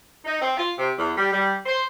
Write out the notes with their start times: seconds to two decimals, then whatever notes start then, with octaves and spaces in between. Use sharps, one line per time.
0.25 D#4
0.41 C4
0.57 F4
0.77 C3
0.97 E2
1.17 G3
1.31 G3
1.66 C5